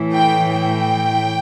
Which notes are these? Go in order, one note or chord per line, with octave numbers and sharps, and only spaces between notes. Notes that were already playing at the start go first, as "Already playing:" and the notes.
Already playing: A2 E3
G5
G5